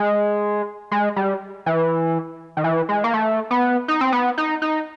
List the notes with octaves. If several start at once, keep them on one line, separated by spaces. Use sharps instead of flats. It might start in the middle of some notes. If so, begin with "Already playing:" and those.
Already playing: G#3
G#3
G3
E3
D#3
E3
G#3
A#3
A3
B3
D#4
C4
B3
D#4
D#4